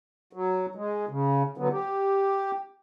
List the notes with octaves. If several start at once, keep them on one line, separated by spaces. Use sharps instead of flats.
F#3
G#3
C#3
D3 F#3 B3
G4